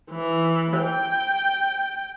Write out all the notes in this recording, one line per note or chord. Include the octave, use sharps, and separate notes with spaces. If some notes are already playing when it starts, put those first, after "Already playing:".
E3
G5